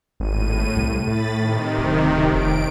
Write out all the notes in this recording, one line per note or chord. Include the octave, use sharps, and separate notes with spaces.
G#1 A2 D#7
C2
A2 B5 A6
C3 D#3
D1
F1 D7